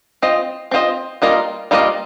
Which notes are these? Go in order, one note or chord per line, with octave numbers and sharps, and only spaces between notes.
C4 F4 C5 D#5
C4 F4 C5 D#5
G3 A#3 F4 A#4 D#5
G3 A#3 F4 A#4 D#5